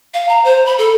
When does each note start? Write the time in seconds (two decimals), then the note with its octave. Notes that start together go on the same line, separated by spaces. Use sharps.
0.14 F5
0.29 A#5
0.44 C5
0.66 B5
0.78 A4